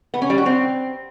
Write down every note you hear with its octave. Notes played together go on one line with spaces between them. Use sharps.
B3
C#4
G3
F#4
C4